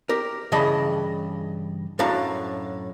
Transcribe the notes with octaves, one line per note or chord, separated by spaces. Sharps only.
G4 A#4
G2 C#3 E3 D#5 A5 B5
F#2 A2 D4 F#4 F5 A#5